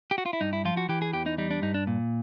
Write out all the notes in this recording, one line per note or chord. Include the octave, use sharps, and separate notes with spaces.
G4
F#4
F4
E4
G2 D#4
E4
F3 F4
F#4
E3 G4
G#4
E2 G4
D#4
G3 D#4
D4
G2 D#4
D4
A#2